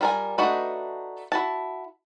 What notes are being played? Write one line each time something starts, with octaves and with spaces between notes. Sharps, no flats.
G3 F4 A#4 C5 G#5
A3 D4 D#4 F#4 B4
E4 F#4 A5